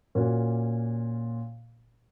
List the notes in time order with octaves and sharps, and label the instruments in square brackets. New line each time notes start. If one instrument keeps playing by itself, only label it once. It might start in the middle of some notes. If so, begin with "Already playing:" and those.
[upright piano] A#2 A#3 C#4 F#4